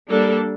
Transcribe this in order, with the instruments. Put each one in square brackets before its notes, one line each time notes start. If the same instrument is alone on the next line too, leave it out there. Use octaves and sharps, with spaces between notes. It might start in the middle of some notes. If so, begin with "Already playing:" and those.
[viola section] G3 A#3 D4 A4